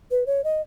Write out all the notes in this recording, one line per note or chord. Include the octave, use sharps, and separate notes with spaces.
B4
C#5
D#5